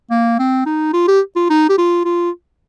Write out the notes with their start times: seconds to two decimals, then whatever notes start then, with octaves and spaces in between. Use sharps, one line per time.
0.10 A#3
0.39 C4
0.66 D#4
0.94 F4
1.08 G4
1.36 F4
1.50 D#4
1.69 G4
1.78 F4
2.05 F4